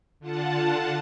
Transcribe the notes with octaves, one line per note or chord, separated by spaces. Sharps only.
D3 F4 F#5 A5